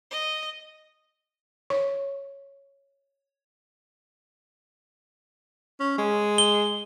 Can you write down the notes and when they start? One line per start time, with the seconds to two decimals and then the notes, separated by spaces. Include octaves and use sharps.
0.10 D#5
1.70 C#5 C#6
5.80 C#4
5.98 G#3
6.38 G7